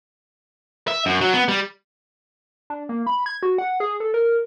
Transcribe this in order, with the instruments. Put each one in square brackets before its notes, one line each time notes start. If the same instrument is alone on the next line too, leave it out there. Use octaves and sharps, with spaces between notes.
[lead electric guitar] E5
F#2
F#3
B3
G3
[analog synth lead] D4
A#3
B5
G#6
F#4
F#5
G#4
A4
A#4